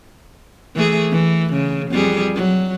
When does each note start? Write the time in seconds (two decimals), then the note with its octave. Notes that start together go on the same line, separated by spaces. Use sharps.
0.75 E3 A3 G#4
1.11 E3
1.53 C#3
1.91 F2 G3 G#4
2.35 F#3